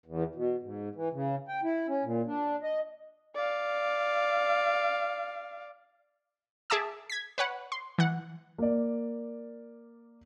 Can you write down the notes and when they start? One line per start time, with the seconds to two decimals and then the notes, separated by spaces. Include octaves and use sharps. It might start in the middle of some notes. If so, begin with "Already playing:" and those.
0.06 E2
0.35 B2
0.62 G#2
0.95 E3
1.13 C#3
1.48 G5
1.63 E4
1.88 C#4
2.04 A#2
2.27 D4
2.63 D#5
3.35 D5 F5
6.70 G#4 E5 A5 D6 E6
7.10 G#6 B6
7.38 B4 C#5 F#5
7.72 C6
7.98 E3 F#5
8.58 A#3 D5